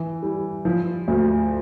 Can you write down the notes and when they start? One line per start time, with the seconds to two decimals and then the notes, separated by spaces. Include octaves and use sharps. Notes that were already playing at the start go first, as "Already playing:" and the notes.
Already playing: E3
0.23 G3
0.65 F3
1.08 D2